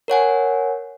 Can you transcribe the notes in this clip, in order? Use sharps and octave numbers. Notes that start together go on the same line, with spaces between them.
A#4 C#5 F#5 G#5